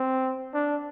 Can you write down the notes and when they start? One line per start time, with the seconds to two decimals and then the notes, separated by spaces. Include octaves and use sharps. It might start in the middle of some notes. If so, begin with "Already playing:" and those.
Already playing: C4
0.54 D4